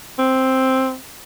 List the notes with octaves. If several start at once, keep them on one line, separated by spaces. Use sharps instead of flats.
C4